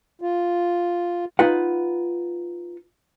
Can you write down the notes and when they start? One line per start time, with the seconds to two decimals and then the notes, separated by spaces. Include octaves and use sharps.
0.22 F4
1.39 D#4 F4 B4 F#5